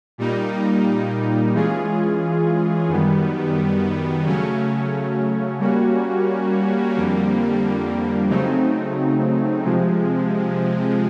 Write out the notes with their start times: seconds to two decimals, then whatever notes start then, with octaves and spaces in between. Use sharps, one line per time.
0.18 A#2 G3 A#3 D#4
1.54 E3 G#3 C#4 F4 G#4
2.88 F#2 D#3 G3 B3
4.24 C#3 F#3 A3 C#4
5.60 G3 A#3 C#4 F#4
6.95 F2 D3 G3 A#3
8.30 C#3 F#3 A3 C4 D#4
9.65 C3 F3 G#3